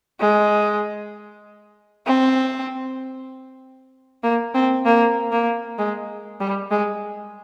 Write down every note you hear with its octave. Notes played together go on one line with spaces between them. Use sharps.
G#3
C4
A#3
C4
A#3
A#3
G#3
G3
G#3